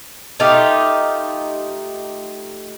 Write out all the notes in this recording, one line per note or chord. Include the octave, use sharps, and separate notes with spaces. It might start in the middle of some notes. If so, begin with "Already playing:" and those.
A3 D#4 F4 G4